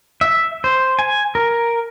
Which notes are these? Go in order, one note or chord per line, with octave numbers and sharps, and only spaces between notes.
E5
C5
G#5
A#4